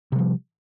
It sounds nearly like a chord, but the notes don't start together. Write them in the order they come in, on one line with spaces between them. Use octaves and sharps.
C3 G3 F3